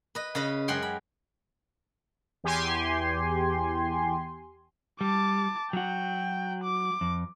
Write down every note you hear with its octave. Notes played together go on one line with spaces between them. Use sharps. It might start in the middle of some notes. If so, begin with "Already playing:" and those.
B4 D#5
C#3 B4 D#5 B5
F#2 G#3 F#5 G5 C6
B5
E2 G4 G#5 C6
G3 A5 D6
F#3 F#4 G5
D6
F2